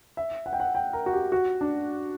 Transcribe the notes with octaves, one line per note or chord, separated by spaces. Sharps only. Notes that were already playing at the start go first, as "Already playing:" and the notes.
E5
F#5
G5
F#5
G5
A#4
F#4
G4
F#4
D4